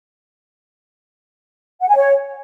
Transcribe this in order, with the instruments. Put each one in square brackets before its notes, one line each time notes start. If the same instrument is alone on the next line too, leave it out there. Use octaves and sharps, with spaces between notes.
[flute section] F#5
G#5
C#5